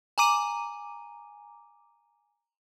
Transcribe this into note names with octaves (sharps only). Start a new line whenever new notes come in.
G#5 A#5 D6 D#7